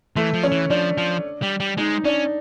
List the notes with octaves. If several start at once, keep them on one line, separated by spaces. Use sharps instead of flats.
E3 A3
F3
C#4
E3
F3 D4
F3
G3
G3
G#3 D#4
C#4 D4